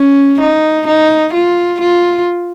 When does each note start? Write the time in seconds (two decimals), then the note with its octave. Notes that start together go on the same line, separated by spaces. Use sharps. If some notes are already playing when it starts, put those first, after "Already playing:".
Already playing: C#4
0.40 D#4
0.87 D#4
1.33 F4
1.80 F4